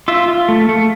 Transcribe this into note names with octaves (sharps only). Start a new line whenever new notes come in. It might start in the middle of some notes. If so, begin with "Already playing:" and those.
F4 E5
F4
A3
A3